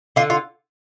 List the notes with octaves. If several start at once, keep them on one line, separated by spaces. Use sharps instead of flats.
D3 F4
F4